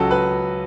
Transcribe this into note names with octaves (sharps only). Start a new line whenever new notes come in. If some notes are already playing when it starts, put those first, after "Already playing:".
Already playing: C#2 C#3 F#3 F#4 A4
B4